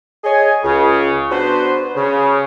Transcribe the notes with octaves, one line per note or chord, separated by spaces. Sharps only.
G#4 C#5 D#5 G#5
C#2 C#3
B3 D4 F#4 B4 C5
C#3